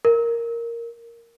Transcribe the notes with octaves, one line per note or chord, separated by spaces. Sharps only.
A#4